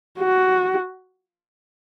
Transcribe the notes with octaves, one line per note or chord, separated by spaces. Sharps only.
F#4